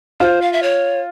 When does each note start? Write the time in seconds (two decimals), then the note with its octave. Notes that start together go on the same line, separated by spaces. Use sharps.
0.20 F4 C5
0.42 F5
0.53 E5
0.63 C#5